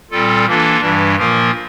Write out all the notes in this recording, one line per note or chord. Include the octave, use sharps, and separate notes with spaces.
A#2 G3 C4 F4 A4
E3 A#3 D4 F4 A4
G2 E3 G3 D4
A#2 F3 A#3 F4 A#4